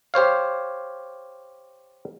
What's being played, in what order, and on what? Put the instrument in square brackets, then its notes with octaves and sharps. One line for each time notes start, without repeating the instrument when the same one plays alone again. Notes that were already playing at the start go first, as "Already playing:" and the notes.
[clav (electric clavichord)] G4 C5 C#5 F5